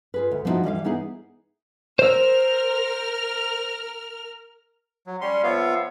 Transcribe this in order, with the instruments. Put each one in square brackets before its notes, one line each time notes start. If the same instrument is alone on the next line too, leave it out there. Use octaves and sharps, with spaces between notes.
[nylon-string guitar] F4 G#4 B4
D2
F3 B3 C4 D#4 E4 F#4
E3 G3 E5 F5
B3 D#4 E4 G#4
[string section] A#4 F6 [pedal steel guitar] C5 E6
[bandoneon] F#3
[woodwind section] G3 C#4 [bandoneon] C6
[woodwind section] F2 C#5 E5 [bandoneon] B3 F4 F5